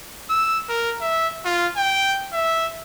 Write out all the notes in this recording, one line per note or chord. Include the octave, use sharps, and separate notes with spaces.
E6
A#4
E5
F4
G5
E5